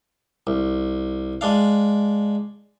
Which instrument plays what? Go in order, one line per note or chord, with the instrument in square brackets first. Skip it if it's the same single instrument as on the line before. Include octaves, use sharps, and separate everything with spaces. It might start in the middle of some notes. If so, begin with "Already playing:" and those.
[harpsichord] C2
G#3 D4 F5